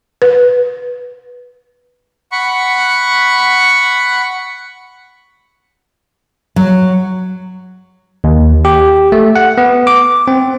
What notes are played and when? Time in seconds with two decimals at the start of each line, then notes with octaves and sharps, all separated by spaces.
0.22 B4
2.32 F#5 B5 C#6
6.56 F#3
8.24 D#2
8.65 G4
9.12 A3
9.36 F#5
9.58 B3
9.87 D6
10.28 C4